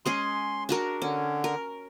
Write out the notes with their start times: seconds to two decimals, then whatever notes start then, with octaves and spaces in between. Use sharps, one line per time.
0.06 G#3 C#4 G#4 C6
0.69 D4 F#4 A#4
1.02 D3 C#4
1.44 A#4